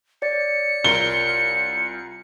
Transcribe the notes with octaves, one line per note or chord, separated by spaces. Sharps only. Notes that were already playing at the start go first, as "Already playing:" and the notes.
C#5 D5 A6 C#7
C2 F4 A#4 G7